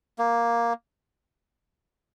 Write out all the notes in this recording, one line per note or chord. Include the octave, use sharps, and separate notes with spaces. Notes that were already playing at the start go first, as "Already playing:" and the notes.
A#3